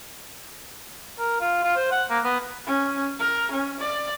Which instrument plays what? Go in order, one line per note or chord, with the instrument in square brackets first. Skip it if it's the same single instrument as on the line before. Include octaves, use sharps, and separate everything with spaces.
[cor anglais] A#4
F4
F4
C5
F#5
A#3
B3
[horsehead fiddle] C#4
A#4
C#4
D5